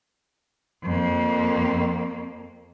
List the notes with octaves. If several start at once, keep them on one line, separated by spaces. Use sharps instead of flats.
F2 A#3